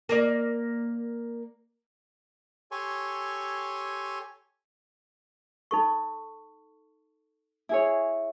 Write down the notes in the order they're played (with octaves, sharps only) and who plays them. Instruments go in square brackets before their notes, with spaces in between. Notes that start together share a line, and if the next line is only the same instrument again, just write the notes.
[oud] A#3 A#4 D5
[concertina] G4 A4 C#5 G#5 C6 C#6
[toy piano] D#4 A4 C#6
[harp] E4 G#4 C#5